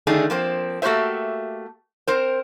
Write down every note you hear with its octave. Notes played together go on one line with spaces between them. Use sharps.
D3 D#3 A3 D4 D#4 G#4
F3 A#3 C4
A3 A#3 F#4 G4 C5 E5
C4 A#4 C5